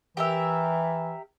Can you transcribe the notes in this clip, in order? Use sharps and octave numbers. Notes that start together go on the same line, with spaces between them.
E3 G4 A#4 E5